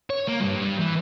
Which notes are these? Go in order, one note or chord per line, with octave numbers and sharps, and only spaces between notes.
C#5
A#3
G2
E3